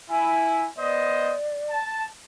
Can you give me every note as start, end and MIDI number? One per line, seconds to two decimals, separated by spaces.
0.10 0.67 64
0.10 0.63 80
0.78 1.34 59
0.78 1.34 72
0.78 1.73 74
0.78 1.34 75
1.70 2.06 81